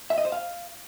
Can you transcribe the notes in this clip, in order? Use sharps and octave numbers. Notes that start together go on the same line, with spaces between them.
E5
D#5
C5
F5